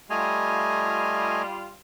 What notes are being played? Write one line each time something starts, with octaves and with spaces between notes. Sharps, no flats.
G3 A3 F4 D#5 G#5